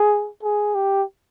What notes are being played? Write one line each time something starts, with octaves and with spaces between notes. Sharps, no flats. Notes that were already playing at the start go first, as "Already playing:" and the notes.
Already playing: G#4
G#4
G4